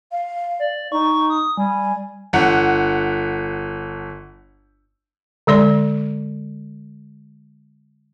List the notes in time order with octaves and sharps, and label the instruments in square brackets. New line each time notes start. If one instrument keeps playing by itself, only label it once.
[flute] F5
[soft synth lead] D5
[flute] D#4 [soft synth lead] C#6
[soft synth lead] D#6
[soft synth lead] G3 [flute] G#5
[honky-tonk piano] G1 F#5
[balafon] D3 G#3 D5 C6